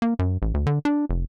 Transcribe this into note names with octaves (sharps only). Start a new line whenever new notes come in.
A#3
F#2
A1
D2
D3
D4
F1